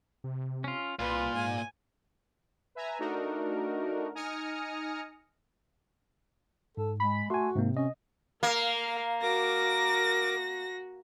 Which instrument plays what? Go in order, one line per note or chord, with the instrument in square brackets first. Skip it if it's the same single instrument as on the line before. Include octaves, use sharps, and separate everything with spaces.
[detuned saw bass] C3
[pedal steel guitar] C#4 F4
[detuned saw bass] C2 [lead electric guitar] A#2 [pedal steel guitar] F4 [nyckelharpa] B4
[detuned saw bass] G#2 [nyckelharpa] G#5
[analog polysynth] B4 E5 G#5 A#5
A3 D4 D#4 F#4 A#4
D#4 G#5 D#6 F6 A#6 C#7
[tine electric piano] G#2 [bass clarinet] A4
[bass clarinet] G#3 [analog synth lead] B5
[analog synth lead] A3 [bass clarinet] F#4 [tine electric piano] G#5 C6
[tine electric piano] G#2 A#3 [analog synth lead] C3
[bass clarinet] C#4 [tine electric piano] D#5
[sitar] A#3 [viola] A#4 F5
[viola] F#4 [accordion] A#4 D6 [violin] A#6